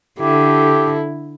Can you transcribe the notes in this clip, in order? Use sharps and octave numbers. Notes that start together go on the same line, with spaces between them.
D3 E4 G4 A4